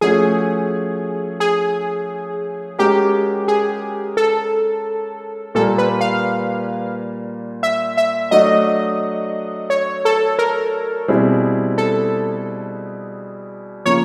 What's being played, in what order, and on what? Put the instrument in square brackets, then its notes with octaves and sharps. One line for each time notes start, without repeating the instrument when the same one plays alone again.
[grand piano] F3 A3 C#4 F#4 [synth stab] G#4
[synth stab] G#4
[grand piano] G#3 C#4 F#4 A#4 [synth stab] G4
[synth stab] G#4
A4
[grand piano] A#2 G3 A#3 [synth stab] A4
[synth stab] B4
F5
E5
E5
[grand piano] F#3 A3 D4 F#4 [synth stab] D#5
[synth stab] C#5
A4
A#4
[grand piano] B2 G3 C4 E4 G#4
[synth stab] A4
[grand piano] C#3 F3 A#3 [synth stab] C#5